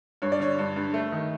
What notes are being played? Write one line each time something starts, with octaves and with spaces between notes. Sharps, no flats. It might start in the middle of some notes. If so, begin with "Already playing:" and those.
G2 C#5
D5
D3 C#5
G2
G2
A3
D#3